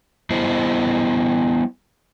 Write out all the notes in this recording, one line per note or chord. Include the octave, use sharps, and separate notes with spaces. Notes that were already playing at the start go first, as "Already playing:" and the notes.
G3 B3 E4 C5 D#5